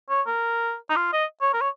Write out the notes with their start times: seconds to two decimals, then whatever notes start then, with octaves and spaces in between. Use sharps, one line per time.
0.10 C#5
0.27 A#4
0.90 D#4
0.96 F4
1.13 D#5
1.41 C#5
1.53 A#4
1.61 C#5